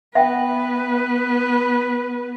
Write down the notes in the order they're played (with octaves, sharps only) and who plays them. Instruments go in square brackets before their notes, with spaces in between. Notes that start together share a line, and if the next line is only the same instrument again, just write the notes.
[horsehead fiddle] B3 B4 [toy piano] E5 F#5 G5